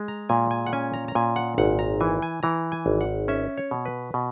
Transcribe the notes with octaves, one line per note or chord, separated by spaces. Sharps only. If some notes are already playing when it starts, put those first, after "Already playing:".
Already playing: G#3
A#5
A#2 G#5
G#5
F#5
C#4 G#5
A#5
A#5
A#2 G#5
F#5
G#1 F#5
A#5
E3 G#5
G#5
E3 A#5
G#5
G#1
F#5
C#4 E5
C#5
B2
B4
B2